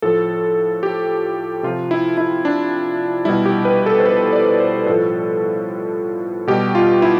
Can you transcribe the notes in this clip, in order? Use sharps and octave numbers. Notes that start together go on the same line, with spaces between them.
A2 F3 A4
G4
C3 F3 F4
E4
E4
D4
B2 G3 E4
G4
B4
A4
C5
B4
D5
C5
A2 F3 A4
B2 G3 G4
F4
E4